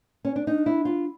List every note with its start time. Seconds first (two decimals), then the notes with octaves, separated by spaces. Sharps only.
0.25 C#4
0.36 D4
0.47 D4 D#4
0.66 E4
0.85 F4